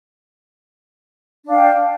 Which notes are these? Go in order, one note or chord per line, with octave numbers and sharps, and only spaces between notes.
D4 F5 G5